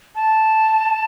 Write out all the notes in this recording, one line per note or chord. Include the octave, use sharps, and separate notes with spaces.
A5